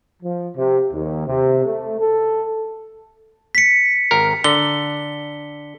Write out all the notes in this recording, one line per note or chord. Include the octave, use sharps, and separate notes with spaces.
F3
C3
D#2
C3
A3
A4
B6 C#7
G#1 A#4
D3 G7